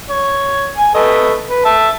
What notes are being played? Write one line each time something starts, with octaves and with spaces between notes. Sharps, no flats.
C#5
G#5
A3 B4 D#5
B4
E5 A5